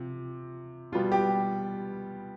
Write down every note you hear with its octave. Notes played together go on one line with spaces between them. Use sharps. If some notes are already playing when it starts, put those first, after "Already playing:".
Already playing: C3 F3
B2 G3 B3 F4
G4